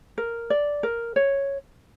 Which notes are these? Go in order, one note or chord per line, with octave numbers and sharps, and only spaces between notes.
A#4
D5
A#4
C#5